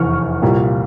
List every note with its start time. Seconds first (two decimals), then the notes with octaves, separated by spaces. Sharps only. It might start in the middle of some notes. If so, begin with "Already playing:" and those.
Already playing: F1 E2 E3 C#6 F6
0.42 C2 A#2 G3 A#3